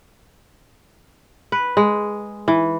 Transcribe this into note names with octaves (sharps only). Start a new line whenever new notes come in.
B4
G#3
E3